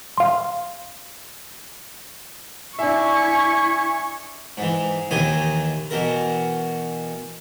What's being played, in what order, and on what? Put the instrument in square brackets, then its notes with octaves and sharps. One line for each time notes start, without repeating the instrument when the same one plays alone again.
[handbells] F5 C6
[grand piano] D4 E5 [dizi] E4 [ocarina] G#5 [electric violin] C#6
[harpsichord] G#2 E3
D#2 D#3 E3 G#5 D#6
B2 E3 A#4